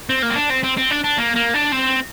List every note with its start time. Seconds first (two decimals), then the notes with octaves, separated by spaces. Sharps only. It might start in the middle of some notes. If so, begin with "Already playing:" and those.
0.09 C4
0.22 A#3
0.30 C4
0.36 D4
0.50 C4
0.64 C4
0.77 C4
0.91 D4
1.04 D4
1.18 A#3
1.36 A#3
1.54 D4
1.72 C4